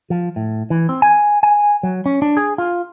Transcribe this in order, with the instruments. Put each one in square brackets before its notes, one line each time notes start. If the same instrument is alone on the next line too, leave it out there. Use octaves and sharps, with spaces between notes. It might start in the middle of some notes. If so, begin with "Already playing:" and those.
[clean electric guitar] F3
A2
E3
C4
G#5
G#5
F#3
C#4
D4
G#4
F4